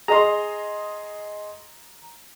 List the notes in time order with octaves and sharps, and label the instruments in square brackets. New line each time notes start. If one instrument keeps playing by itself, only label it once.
[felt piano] G#4 D#5 C6 [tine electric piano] A#5